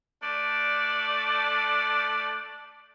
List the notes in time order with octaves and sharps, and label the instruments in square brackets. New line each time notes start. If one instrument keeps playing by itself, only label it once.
[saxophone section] A3 D4 D5